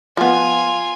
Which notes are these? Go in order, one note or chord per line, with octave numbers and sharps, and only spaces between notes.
F3 B3 F4 G#5